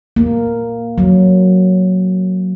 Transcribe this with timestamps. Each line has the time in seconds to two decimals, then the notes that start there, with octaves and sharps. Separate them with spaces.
0.16 A#3
0.98 F#3